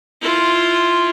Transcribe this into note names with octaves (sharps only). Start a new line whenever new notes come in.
E4 F4